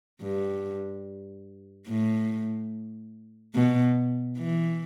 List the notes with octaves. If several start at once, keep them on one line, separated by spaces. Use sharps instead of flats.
G2
A2
B2
E3